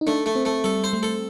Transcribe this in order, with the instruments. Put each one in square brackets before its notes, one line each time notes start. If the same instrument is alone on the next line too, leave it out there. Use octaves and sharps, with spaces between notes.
[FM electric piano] D#4
[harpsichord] A3 [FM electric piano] D4
[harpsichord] A3
[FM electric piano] C4
[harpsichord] A3
[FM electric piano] G3 [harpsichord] A4
[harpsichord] C5
[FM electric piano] A3
[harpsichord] A4